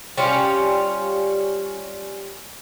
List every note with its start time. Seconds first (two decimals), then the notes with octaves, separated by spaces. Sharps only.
0.18 G3 C#4 F4